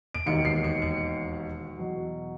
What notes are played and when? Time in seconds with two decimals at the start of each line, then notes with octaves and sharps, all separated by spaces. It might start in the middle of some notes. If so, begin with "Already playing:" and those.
0.15 D7
0.26 E1 D#2 D#3 C#7
0.45 C7
0.64 C#7
0.82 C#7
1.75 E2 B2 F#3